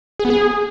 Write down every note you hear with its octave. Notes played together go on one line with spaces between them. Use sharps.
G#4
B3
G#4